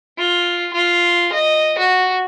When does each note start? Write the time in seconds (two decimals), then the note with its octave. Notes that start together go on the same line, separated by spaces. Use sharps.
0.18 F4
0.73 F4
1.33 D#5
1.78 F#4